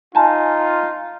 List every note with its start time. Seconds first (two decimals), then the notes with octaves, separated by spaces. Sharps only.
0.15 D#4 F4 G#5 A5